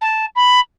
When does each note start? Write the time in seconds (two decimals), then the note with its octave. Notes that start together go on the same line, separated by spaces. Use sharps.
0.01 A5
0.35 B5